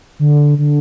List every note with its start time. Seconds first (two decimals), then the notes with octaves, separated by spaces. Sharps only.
0.19 D3
0.58 D3